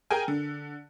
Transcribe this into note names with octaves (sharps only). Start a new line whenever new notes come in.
G#4 A#4 G5 G#5
D3